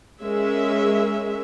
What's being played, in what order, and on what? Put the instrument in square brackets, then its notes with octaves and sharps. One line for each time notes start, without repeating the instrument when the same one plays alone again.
[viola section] G#3 C#4 A#4 E5